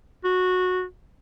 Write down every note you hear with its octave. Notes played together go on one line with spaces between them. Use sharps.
F#4